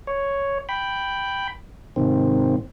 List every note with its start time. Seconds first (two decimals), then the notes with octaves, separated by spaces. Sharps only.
0.07 C#5
0.69 G5 B5
1.96 G#2 C3 D#3 C4